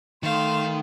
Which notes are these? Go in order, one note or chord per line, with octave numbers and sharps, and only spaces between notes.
D#3 A3 F5 C6 E7